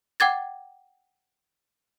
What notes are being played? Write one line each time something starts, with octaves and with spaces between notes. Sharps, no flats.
F#5 G5 D6 G#6 A6